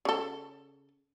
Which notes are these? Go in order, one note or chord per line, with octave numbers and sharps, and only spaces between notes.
C#3 A4